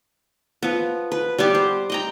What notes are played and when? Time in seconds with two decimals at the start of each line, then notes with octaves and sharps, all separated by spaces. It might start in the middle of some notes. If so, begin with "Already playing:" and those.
0.62 F3 B3
1.12 B4
1.38 G3 B3 G4
1.55 C5
1.90 D#5 G5 A#5